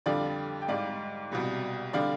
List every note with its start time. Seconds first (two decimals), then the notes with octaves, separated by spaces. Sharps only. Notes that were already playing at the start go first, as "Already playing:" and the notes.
0.06 F2 D3 G3 D5 F5
0.61 G5
0.68 G#2 G3 D5 F5
1.31 C2 B2 G3
1.93 D3 G3 D5 F5